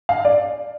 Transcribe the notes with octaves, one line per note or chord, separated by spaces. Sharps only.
F5
D5